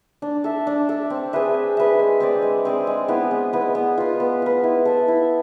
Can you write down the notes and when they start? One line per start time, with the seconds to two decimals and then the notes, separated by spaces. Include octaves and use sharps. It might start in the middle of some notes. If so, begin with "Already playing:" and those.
0.22 D4
0.44 A4 E5
0.67 D4
0.89 A4 E5
1.10 C4
1.33 G#4 B4 E5
1.54 C4
1.77 G#4 B4 E5
1.99 G#3
2.20 C4 G#4 D5
2.42 G#3
2.65 C4 G#4 D5
2.87 G#3
3.08 B3 E4 B4
3.31 G#3
3.53 B3 E4 B4
3.75 B3
3.98 F4 B4
4.20 B3
4.42 F4 B4
4.64 E4
4.85 A4 E5
5.08 E4